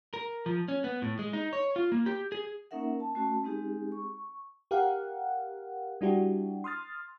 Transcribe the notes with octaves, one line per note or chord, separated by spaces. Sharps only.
A#4
F3
C#4
B3
A2
G#3
D#4
C#5
F4
A#3
G4
G#4
A#3 C#4 D#4 A#4 E5 F#5
A5
A3 C#4 F#4 A5
G#3 C4 D#4 G4 G#4
C#6
G4 A#4 F5 F#5
G3 D4 E4 F#4 G4
C6 D#6 F6 A6